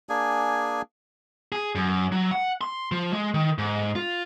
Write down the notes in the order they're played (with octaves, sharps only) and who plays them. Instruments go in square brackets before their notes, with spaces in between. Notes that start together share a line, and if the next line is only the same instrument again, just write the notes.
[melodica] A#3 D4 G#4 G#5
[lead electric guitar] G#4
F#2
F#3
F#5
C6
F3
G#3
D#3
G#2
F4